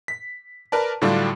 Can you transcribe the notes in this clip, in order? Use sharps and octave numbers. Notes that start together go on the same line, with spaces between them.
B6
A#4 B4 D5 A5
A2 D3 F#3 G3 D4 F4